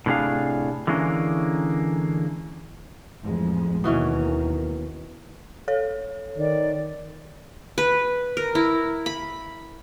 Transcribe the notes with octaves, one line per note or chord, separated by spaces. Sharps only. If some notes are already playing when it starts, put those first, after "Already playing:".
A2 C3 F#3 D4 G#4 F5
D3 E3 G#3 A#3 C#4
A1 F2 G#3
D#2 B2 D#3 E3 C#4
A4 C#5
D#3 D5
B4
A#4
E4
B5